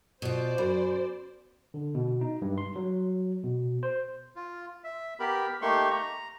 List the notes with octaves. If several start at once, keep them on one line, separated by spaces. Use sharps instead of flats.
B2 F4 C5 D5
F#2 F#4 B5 C6
D3
B2
D#4
G2
C6
F#3
B2
C5
F4
E5
B3 G4 A#4 B5
A3 A#3 D#4 G4 C6 C#6
A#5